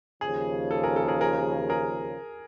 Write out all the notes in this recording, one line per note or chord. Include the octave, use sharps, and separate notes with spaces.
D#2 C#3 F3 G#4
A4
G#4 A#4
A4
G#4 A#4
G#4 A#4
G#4 A#4